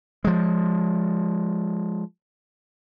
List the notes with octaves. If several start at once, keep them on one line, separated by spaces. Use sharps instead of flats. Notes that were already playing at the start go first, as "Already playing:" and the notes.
F3 G#3